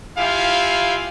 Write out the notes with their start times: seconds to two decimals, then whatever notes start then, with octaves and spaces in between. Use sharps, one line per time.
0.18 E4 F4 G4 F5 G#5